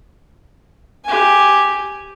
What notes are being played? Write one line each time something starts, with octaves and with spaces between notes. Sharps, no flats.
G4 G#5